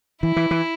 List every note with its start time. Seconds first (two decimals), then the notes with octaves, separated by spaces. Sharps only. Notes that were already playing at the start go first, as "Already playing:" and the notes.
0.23 E3 E4
0.36 E3
0.51 E3